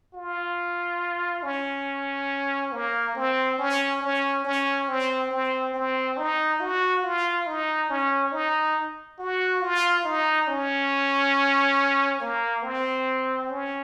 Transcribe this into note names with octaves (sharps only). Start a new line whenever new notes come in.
F4
C#4
A#3
C4
C#4
C#4
C#4
C4
C4
C4
D#4
F#4
F4
D#4
C#4
D#4
F#4
F4
D#4
C#4
A#3
C4
C#4